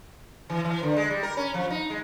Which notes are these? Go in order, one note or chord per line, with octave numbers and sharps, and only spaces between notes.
E3
E3
D3
G#3
G3
A#4
C#4
F3
D#4
G#3